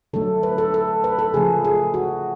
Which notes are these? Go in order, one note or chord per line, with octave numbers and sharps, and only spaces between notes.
D3 F#3 A3 A4
B4
A4
A4
B4
A4
C#3 F3 A3 G#4
G#4
F#4